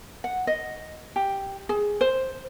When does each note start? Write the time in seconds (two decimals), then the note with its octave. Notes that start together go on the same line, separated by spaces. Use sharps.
0.24 F#5
0.47 D#5
1.16 G4
1.69 G#4
2.01 C5